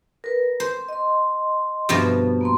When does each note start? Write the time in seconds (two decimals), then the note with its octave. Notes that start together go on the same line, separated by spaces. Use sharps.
0.24 A#4 B4
0.60 C5
0.88 D#5 C6
1.89 G2 B2 F3
2.41 A#3 B3 C6